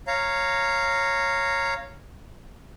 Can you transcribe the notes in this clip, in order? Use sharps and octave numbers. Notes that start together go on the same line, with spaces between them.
C#5 F5 A#5